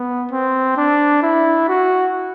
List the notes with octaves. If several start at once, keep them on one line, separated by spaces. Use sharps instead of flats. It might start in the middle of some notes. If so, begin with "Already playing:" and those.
Already playing: B3
C4
D4
E4
F#4